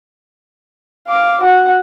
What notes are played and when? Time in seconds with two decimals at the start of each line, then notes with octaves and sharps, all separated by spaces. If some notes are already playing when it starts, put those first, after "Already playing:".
1.08 F5 D6
1.41 F#4 F#5